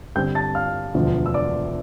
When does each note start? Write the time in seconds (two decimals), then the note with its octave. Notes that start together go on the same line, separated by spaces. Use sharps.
0.15 G2 D3 G3 C4 G5 G6
0.35 A5 A6
0.55 F5 F6
0.95 E1 D2 D3 F3
1.26 E6
1.34 D5 D6